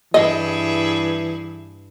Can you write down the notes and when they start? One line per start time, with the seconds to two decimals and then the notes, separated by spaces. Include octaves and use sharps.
0.14 G2 E3 E4 G#4 D#5